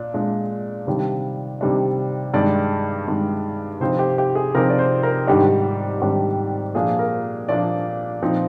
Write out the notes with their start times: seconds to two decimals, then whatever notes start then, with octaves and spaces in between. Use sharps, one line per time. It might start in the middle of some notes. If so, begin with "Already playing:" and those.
Already playing: A#2 D4
0.14 A#2 G#3 D4
0.87 C3 D#3 G3 D4
1.61 C3 D#3 G3 D4
2.34 G2 D#3 G#3 D5
3.07 G2 D#3 G#3
3.80 C3 F3 C4 D#4 C5
3.99 G4
4.18 G4
4.35 G#4
4.55 C3 F3 C4 D#4 A#4
4.70 D5
4.79 C5
5.03 A#4
5.28 G#2 D#3 G3 D4 G4
6.02 G#2 D#3 G3 D4
6.75 A#2 F3 A#3 D4 G#4
6.99 A#4
7.49 A#2 F3 A#3 D4 D5
8.22 A#2 F3 C4 D#4